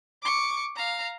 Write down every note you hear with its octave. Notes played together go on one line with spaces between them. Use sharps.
C#6 D6
F5 A#5